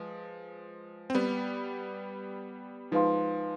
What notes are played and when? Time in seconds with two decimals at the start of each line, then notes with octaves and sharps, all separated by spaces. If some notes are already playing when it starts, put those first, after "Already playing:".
Already playing: F3 G#3 B4
1.10 C4
1.15 G3 B3
2.92 F3 G#3 D#4 B4 F5 C6